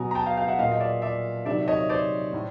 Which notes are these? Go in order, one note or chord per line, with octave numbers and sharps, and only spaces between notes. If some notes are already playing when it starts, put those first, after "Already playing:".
Already playing: B2 F#3 G#5 A#5
A#5
G5 A5
F5 G5
F5 G5
E5 F#5
A#2 F#3 D#5 F5
D#5
D5 E5
D5 E5
C3 D#3 F#3 D5 E5
C#5 D#5
C5 D5
A2